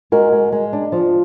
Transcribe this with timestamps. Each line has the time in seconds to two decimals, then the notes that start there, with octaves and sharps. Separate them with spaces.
0.12 G#3 F#4 A#4
0.32 G#3
0.52 G#3
0.73 D4
0.92 F3